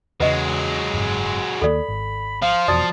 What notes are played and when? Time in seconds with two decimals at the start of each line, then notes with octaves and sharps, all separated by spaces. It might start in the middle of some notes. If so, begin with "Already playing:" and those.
0.20 E2 C#3 F#3 G#3 B4 D#5
0.94 F#1 G#2
1.62 D#2 D#3 A#3 A4 D5 B5
1.88 G#1
2.42 F3 F5
2.68 F1 E2 B2 F#4 D5 A5 D#6